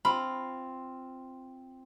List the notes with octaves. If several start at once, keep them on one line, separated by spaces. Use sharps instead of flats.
C4 F4 B5